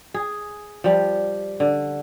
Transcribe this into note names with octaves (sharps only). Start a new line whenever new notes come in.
G#4
F3 G3
D3